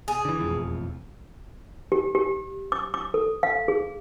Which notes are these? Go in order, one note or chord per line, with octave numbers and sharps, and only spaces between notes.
G#4
D3 E3
E1 A1 F2
G4
G4
D6
D6
A4
F5
G#4